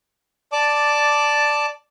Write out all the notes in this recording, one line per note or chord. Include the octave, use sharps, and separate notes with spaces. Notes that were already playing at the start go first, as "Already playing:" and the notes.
D5 A5 D6